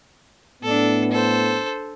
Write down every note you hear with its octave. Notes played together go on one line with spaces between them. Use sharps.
A2 B3 D4 A4
A4 C5